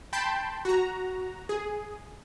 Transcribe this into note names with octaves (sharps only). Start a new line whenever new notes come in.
G5 A5 B5 C6 G6
F#4 A#5
G#4